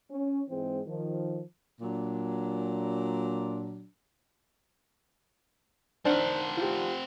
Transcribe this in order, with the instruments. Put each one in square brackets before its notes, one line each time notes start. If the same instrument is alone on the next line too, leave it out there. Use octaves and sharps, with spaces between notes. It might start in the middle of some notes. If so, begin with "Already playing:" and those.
[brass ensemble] C#4
G#2 E3 G#3 C4
D#3 F3
[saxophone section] A#2 F#3 D4
[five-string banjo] D#3 D4 [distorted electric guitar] C4 F#5 [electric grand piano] C5
[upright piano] F4 G4